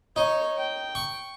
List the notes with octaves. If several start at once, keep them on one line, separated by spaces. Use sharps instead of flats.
D#4 C#5
G5
C#6